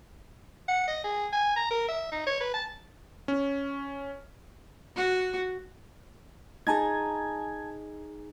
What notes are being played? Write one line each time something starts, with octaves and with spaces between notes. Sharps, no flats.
F#5
D#5
G#4
G#5
A#5
A#4
E5
D#4
C#5
B4
A5
C#4
F#4
D#4 G#4 G#5 A5 G#6